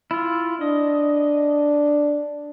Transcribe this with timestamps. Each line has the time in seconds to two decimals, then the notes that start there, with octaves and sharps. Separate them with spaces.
0.11 E4 F4
0.61 D4 D#5